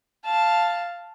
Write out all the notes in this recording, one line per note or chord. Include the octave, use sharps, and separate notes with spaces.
F5 A5